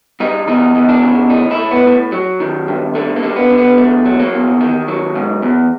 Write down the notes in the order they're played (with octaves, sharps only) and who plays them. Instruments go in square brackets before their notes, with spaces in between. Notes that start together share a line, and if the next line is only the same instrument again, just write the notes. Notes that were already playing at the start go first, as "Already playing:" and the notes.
[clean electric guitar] G2 D#4
E2 D#4
E2
D4
C#3
A2 D#4
E4
A2
B3
A2
F#3
D#3
G2
D3 A3
A#3
D3
B3
D3
B3
E2 A3
F#3
A#3
E2
D#3
F#3
G#2
E2